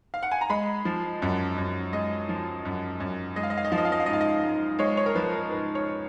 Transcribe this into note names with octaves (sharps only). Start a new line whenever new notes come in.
F5
F#5
G#5
A#5
G#3 B5
F3
F#2
F#2
G#3 D#5
F3
F#2
F#2
G#3 D#5
F5
D#5
F5
D#5
F3 F5
D#5
F5
D#5
F5
G#2 D#5
F5
D#5
G#2
G#3 C#5
C#5
A#4
F3 B4
A#4
G#2 B4
C#5